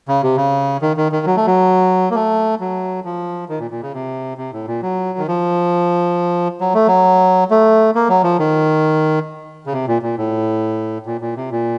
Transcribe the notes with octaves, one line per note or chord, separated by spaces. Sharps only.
C#3
C3
C#3
D#3
D#3
D#3
F#3
A3
F#3
A#3
A3
F#3
F3
D#3
A#2
A#2
C#3
C3
C3
A2
A#2
F#3
D#3
F3
F#3
A3
F#3
A3
A#3
F#3
F3
D#3
C#3
C3
A#2
A#2
A2
A#2
A#2
C3
A#2